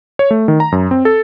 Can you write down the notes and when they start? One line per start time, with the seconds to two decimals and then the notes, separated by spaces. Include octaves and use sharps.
0.19 C#5
0.31 A3
0.48 D#3
0.60 A#5
0.72 F#2
0.91 C4
1.05 A4